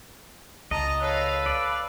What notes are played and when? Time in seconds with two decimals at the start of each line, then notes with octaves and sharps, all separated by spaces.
0.71 C#2 D#5 A5 A#5
1.01 A4 B4 C#5 F5
1.46 D5 F5